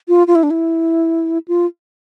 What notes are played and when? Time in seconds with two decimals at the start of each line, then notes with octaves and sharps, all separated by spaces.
0.08 F4
0.27 F4
0.35 E4
0.43 D4
0.51 E4
1.48 F4